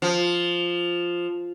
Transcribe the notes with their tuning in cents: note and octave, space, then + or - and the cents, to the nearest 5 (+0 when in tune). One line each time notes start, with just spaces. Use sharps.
F3 +0